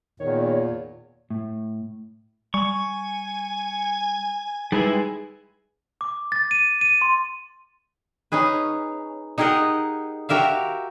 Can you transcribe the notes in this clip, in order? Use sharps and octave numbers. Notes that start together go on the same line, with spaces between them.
E2 A#2 D#3 C#5
A2
G3 G#5 C#6
G3 G#3 D#4 E4 G#4 B4
D6
A6
D#7
D#7
C6
C#4 D#4 G#4 B4
D#4 G4 G#4 A#4 D#5 F#5
F#4 G4 A#4 E5 F5